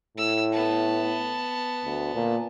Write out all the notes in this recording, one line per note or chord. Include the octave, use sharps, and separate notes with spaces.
A2 E6
B3 A5
D2
A#2